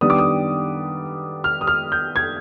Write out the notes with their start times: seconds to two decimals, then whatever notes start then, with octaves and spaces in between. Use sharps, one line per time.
0.01 D#3 G3 B3 D4 D#6
0.10 D6
0.19 D#6
1.44 F6
1.61 D#6
1.67 F6
1.92 G6
2.16 G#6